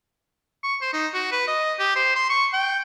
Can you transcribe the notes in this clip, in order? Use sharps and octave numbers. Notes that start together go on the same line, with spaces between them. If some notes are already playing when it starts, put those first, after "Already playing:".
C#6
C5
D#4
F#4
B4
D#5
G4
C5
C6
C#6
G5